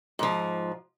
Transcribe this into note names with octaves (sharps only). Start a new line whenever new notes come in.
G#2 F3